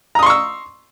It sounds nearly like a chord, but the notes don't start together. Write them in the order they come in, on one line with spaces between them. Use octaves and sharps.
A#5 D#6 C6 C#6 E6